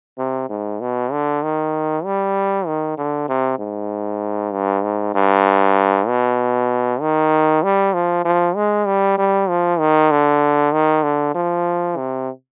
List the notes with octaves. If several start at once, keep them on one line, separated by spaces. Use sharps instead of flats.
C3
G#2
B2
D3
D#3
G3
D#3
D3
C3
G#2
G2
G#2
G2
B2
D#3
G3
F3
F3
G#3
G3
G3
F3
D#3
D3
D#3
D3
F3
C3